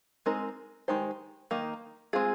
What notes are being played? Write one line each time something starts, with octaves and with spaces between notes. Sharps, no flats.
G#3 C4 D#4 A#4
D#3 G#3 D#4 G4 C5
D#3 A#3 D#4
G#3 C4 F4 G#4